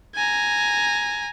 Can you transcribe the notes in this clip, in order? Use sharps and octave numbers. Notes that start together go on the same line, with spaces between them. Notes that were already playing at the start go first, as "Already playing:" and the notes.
G#5 A#5